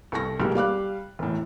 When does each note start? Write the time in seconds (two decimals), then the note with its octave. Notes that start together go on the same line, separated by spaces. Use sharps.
0.12 C2 A4 C#6 A#6
0.40 B1 G#3 A#3 G4
0.55 G3 F5 D6 F#6
1.19 E1 A2